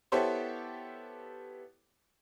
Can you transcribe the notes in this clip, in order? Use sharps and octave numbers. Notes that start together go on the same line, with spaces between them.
B3 E4 G4 A4 C5 C#5